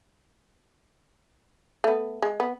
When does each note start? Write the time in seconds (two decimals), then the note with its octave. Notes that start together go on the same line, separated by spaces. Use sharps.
1.84 A3 B3
2.22 G#3
2.40 B3